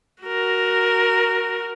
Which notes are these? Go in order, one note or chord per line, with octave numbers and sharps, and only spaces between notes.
F#4 A#4